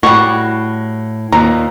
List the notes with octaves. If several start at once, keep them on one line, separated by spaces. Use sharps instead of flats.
A2 G3 F#4
D#2 A#2 A#5